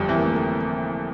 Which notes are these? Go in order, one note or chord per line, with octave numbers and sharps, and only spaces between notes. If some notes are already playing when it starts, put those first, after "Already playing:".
Already playing: G1 F2 G3
E3 C4
A#3
A3
A#3